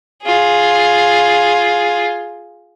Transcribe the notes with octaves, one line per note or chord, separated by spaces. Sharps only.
F4 G#4